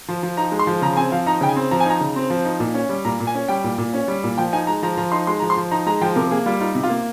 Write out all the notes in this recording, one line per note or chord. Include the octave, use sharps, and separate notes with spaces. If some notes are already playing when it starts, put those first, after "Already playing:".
F3
F3
D#4 A#5
G#3
C6
F3
C#3 A#5
C4 G#5
F3 F5
D#4 A#5
C#3 G5
G#5
C4
F3 A#5
G#5
D#4 A#5
C#3
C4
F3
D#4
A#2
C#4
G3
A#2 A#5
A#2
G#5
C#4
G3 G5
A#2
A#2
C#4
G3
A#2
F3 G5
D#4 G#5
G#3 A#5
F3 A#5
F3 A#5
D#4 C6
G#3 C6
F3 A#5
C6
F3
D#4 A#5
G#3 A#5
F3 G5
C3 A#4
A#3 G#4
G3 F4
D#4 F4
C3
F4
A#3